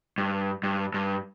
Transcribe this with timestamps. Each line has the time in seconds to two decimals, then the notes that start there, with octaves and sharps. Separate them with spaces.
0.18 G2
0.63 G2
0.94 G2